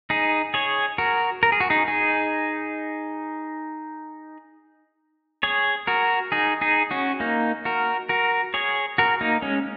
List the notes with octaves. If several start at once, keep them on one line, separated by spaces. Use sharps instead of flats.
D#4 G#4
G#4 C#5
F#4 A#4
A#4
G#4
F#4
D#4 G#4
D#4 G#4
G#4 C#5
F#4 A#4
D#4 G#4
D#4 G#4
C#4 F#4
A#3 D#4
F#4 A#4
F#4 A#4
G#4 C#5
F#4 A#4
A#3 D#4
G#3 C#4